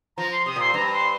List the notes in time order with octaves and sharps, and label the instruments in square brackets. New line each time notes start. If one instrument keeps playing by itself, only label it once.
[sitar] F3 [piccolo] A#5
[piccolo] C6
[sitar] C3 [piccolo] D#6
[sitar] A#2 [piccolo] C6
[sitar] G2 [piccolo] A#5
[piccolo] C6